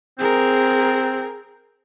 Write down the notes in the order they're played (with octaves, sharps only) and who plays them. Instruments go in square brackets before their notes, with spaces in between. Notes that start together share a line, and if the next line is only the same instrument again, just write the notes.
[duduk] C4 [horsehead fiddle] G#4 A#4